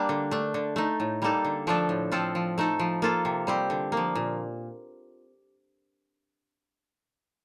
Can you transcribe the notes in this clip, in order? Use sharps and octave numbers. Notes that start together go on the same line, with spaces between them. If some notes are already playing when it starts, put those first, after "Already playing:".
Already playing: G3 A#3 D4
D3
A3 D4
D3
A3 D#4
A2
G3 A#3 D#4 A4
D3
F3 A3 D4 A4
A2
F3 C4 F4 A4
F3
A3 D#4 A4
F3
A#3 F4 A4
C3
G3 C4 G4
D3
A#3
F3
A#2